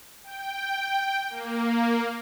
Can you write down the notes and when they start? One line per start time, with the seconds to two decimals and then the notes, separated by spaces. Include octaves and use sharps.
0.23 G5
1.30 A#3